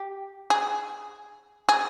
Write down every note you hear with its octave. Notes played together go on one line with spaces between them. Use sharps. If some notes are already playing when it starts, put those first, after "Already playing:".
Already playing: G4
G#4
G#4